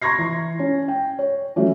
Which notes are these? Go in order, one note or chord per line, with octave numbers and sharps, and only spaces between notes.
A#5 C6 C#6 G#6 A#6 C7
E3
C#4
G5
C#5
E3 F#3 A3 C#4